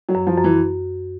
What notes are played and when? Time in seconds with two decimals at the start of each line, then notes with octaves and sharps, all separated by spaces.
0.09 F#3
0.15 F#2
0.27 F3
0.38 F#2
0.44 E3